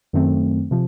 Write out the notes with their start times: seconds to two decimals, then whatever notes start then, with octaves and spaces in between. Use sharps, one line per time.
0.13 F#2 D#3 F#3 A3 C4
0.71 C3 F3